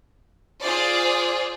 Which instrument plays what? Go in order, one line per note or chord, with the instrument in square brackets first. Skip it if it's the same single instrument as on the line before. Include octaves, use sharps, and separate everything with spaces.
[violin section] F4 G#4 C5 D5